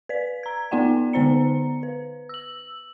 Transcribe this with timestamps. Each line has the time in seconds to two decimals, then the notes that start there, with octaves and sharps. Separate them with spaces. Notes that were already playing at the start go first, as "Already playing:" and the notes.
0.09 B4 D5 B6
0.43 A#5 G#6
0.71 B3 D#4 F4 D5 F#5 G5
1.13 D3 B3 D#4 C5 A#5 C#7
1.83 B4
2.29 E6 F#7